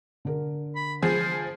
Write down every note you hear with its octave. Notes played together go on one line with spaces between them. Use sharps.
D3 A#4
B5
F3 G#4 C5